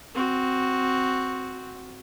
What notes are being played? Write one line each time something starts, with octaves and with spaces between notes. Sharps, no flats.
C4 F#4